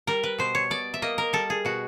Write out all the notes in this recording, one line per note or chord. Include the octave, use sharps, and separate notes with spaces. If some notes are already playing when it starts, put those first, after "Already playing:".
G3 A#4
B4
B2 C5
C#5
B2 D5
E5
A#3 D#5
A#4
G3 A4
G#4
B2 F#4